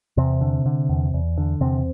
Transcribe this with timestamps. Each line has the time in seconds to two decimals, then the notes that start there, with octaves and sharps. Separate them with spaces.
0.17 E2 C3 C4
0.41 D3
0.66 D3
0.89 E2
1.14 E2
1.38 D3
1.61 E2 C3 C4